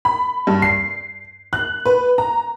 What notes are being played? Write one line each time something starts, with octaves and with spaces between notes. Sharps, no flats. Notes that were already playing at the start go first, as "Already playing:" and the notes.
B5
G2
C7
F#6
B4
A#5